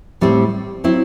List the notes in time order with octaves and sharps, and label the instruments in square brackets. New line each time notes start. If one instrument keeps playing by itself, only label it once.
[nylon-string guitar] A2 G3 C4
F#3 C4 E4